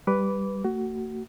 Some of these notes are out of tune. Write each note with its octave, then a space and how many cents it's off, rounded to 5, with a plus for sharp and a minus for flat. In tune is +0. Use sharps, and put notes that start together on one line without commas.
G3 +0 B4 +0 D6 -20
A3 +40 F#4 +20